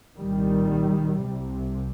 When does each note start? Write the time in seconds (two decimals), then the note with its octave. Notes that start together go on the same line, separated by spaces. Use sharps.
0.17 C2 A#2 D#3 G3
1.22 C2 C3